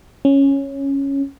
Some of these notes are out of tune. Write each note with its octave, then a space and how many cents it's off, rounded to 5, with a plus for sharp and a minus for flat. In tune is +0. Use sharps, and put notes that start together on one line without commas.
C#4 -5